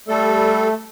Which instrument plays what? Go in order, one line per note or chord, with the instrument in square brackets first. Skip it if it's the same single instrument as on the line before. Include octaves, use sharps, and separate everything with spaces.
[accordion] G3 A4 [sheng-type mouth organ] A3